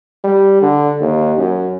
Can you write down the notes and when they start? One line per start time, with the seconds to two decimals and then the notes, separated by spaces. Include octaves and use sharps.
0.24 G3
0.62 D3
1.00 D#2
1.39 F#2